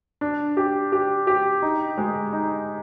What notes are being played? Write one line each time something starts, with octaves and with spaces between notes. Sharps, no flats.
D4
G4
G4
G4
D#4
G#3
D#4